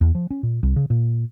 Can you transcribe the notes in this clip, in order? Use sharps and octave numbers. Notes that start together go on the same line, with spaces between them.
E2
F3
C#4
A#2
C2
C#3
A#2